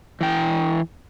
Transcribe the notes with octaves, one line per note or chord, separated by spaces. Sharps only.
E3 G5